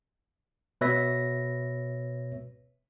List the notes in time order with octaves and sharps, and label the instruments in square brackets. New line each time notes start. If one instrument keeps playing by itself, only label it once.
[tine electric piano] B2 B4 C#5 E5 A#6